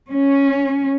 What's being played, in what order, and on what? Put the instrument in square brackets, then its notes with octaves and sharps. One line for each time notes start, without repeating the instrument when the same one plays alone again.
[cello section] C#4